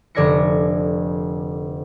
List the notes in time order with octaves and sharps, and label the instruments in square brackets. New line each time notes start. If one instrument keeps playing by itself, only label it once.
[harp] F1 D3 D5 G#6 A#6 C#7